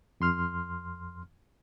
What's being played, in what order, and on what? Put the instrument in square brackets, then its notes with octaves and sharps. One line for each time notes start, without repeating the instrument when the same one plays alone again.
[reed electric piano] F2 C6 F6